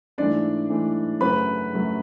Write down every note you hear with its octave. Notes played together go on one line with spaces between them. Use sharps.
G#2 E3 A3 D4 D5
G#2 E3 A3
F#2 C#3 F#3 A3 B4 B5
F#2 C#3 F#3 A3